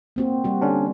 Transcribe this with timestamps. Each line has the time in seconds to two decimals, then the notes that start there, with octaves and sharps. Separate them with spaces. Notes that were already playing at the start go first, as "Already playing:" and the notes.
0.16 A#3 C4 F#4
0.44 G3 F#4
0.61 D3 C#4 D4